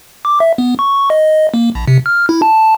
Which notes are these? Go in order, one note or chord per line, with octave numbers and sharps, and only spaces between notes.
D6
E5
B3
C#6
D#5
A#3
A#1
C3
F6
E4
A5